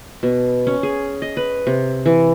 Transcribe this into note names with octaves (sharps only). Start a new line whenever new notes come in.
B2
C#4
G#4
D#5
B4
C3
E3